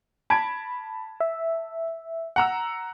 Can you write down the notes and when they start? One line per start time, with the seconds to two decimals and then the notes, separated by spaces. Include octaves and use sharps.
0.30 A5 B5 G#6 D7
1.20 E5
2.36 F#5 A#5 E6